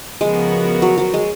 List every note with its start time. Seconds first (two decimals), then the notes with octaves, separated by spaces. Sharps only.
0.21 C#3 F3 G#3 B3 F#4 A#4
0.82 F#3
0.98 F#3
1.14 G#3